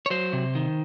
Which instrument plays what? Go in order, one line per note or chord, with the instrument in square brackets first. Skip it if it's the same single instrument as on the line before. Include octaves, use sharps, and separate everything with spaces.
[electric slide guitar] C#5
F#3 C5
C3
D#3